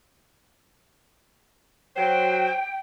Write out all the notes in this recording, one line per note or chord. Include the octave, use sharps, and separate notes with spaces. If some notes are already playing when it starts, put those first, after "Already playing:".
F#3 C5 G5